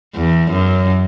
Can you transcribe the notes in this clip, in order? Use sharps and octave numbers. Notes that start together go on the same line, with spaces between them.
E2
F#2